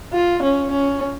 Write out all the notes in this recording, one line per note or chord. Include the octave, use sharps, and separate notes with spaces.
F4
C#4
C#4